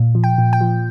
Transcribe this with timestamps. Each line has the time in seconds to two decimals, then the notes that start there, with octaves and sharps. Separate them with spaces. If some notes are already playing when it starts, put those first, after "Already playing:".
Already playing: A#2
0.15 F3
0.24 G5
0.38 A#2
0.53 G5
0.61 F3